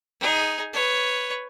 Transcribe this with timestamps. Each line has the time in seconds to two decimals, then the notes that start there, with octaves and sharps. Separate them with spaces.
0.20 D#4 G#4
0.73 B4 C#5